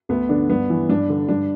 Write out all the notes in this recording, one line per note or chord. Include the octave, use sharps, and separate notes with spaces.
D2 B3
D3 D4
G2 B3
E3
G2 D4
D3
G2 D4